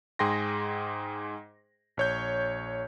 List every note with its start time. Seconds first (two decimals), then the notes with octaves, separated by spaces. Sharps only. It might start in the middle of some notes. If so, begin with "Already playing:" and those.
0.19 G#2 G#4 G5 C6 A#6
1.97 A#1 C#5 G6